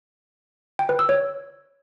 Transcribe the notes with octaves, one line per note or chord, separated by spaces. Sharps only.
G5
B4
E6
C#5